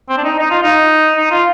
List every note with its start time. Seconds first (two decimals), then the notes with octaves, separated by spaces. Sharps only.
0.09 C4
0.17 D4
0.24 D#4
0.39 D#4
0.51 F4
0.63 D#4
1.17 D#4
1.31 F4